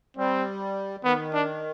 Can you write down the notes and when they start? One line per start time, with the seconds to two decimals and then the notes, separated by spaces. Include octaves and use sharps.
0.17 G3 C4
1.04 D#3 B3
1.33 D4